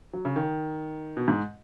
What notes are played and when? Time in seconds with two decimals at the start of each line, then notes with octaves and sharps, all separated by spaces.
0.13 F#3
0.25 C#3
0.36 D#3
1.17 B2
1.28 G#2